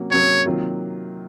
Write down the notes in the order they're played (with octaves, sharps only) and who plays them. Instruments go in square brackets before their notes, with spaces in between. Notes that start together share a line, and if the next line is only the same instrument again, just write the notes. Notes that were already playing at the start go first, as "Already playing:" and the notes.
Already playing: [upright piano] C3 F#3 A#3 C#4 F#4
[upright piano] C3 F#3 A#3 C#4 F#4 [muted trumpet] C#5
[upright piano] C3 D#3 F#3 A#3 F4